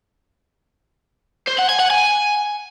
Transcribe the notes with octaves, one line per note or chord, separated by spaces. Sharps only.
C5
F#5
G#5
F#5
G#5